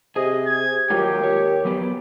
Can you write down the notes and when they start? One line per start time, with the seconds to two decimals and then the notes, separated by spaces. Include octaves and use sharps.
0.16 C3 G#4 D#5
0.46 G#6
0.90 D#2 F#3 G#3 F4 G4
1.23 C#5
1.65 F#3 B3 G4